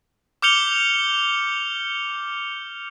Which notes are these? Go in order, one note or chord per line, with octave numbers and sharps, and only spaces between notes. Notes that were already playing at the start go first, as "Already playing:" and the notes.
D6 F6 G6 C#7 F7 G7